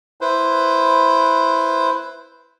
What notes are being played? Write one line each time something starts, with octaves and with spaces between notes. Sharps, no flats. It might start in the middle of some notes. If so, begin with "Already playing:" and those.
E4 B4 C5